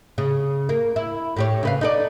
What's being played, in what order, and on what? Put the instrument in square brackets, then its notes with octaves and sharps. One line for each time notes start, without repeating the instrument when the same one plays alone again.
[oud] C#3
A#3
E4
A2 G4 C#5
C#3 B4 F5
D#4 A4 D5